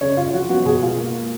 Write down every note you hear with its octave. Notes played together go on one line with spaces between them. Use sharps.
C#3 C#5
C#3 F4
F3 F#4
B3 F#4
B2 G#4
G#3 F4
A#3
A#3